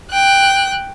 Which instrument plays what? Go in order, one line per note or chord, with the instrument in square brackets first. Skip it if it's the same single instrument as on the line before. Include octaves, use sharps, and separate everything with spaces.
[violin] G5 F#6